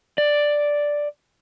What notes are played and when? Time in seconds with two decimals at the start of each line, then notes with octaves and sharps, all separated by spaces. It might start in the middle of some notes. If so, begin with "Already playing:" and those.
0.18 D5